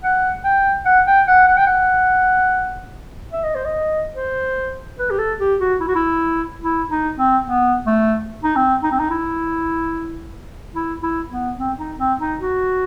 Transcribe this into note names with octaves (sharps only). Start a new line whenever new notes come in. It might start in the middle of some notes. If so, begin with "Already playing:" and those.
F#5
G5
F#5
G5
F#5
F#5
G5
F#5
E5
D#5
C5
D#5
C5
B4
G4
A4
G4
F#4
E4
F#4
E4
E4
D#4
C4
B3
A3
D#4
C4
D#4
C4
D#4
E4
E4
E4
B3
C4
D#4
C4
D#4
F#4